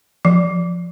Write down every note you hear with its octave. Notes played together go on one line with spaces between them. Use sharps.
F3